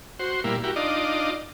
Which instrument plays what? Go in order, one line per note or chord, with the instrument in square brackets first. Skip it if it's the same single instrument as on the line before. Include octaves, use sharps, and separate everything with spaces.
[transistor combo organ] F#4 C5
A#2 G3 A#3 E4
E4 F#4 G4 A#4
D4 D#4 F4 D5 D#5